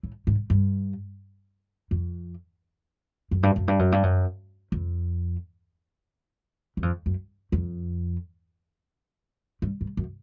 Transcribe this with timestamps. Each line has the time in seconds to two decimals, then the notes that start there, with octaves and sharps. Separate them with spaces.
0.03 A2
0.27 G#2
0.50 G2
1.91 F2
3.31 F#2
3.43 G2
3.56 F#2
3.68 G2
3.79 F#2
3.92 G2
4.03 F#2
4.72 F2
6.77 F#2
6.82 F2
7.06 F#2
7.52 F2
9.62 G2
9.81 G2
9.97 F#2